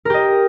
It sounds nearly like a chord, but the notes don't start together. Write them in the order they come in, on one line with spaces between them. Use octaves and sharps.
A#4 G4 D#5